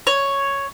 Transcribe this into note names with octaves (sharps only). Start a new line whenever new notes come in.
C#5